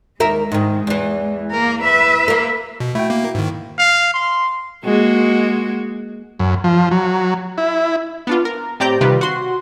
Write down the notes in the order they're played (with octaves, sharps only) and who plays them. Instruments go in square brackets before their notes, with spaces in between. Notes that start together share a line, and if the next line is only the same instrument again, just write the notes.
[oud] D#2 A#4 E5 [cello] G#3
[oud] G#2 D#3
E2 E3
[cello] A#3 A#4
B4 E5
[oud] A#3 A#4
[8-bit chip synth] B2
[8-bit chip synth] A3 [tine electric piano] E4 F#4 G5
[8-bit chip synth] A#3
G#2 D#3
[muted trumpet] F5
C6
[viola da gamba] G#3 A#3 F#4
[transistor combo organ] F#2
F3
F#3
E4
[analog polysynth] B3 D4 F4
A#4
A2 C4 G4 D5 A#5 G6
C3 D#3 G3 F4 G4 B4
F#4 C6